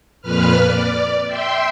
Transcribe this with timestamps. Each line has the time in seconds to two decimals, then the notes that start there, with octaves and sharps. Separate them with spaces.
0.22 F2 A#2 B4 F6
0.66 D5
1.26 E5 G5 C6